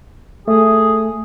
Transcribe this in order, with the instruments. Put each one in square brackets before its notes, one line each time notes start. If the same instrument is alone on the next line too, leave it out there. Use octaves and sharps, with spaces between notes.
[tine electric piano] A3 [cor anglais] G#4